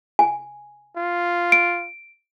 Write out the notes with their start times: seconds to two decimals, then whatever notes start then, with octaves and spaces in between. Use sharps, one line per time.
0.19 G#5
0.96 F4
1.52 D7